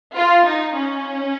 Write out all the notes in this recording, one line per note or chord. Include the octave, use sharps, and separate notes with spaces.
F4
D#4
C#4